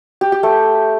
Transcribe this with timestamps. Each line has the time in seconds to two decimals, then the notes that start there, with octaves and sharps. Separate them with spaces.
0.21 G4
0.32 G4
0.43 A3